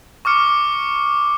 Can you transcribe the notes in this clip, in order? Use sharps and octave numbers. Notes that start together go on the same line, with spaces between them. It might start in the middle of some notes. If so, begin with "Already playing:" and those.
C#6 D6 F6 C#7